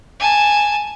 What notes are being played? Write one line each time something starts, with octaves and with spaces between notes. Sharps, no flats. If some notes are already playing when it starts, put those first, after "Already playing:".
G#5 A5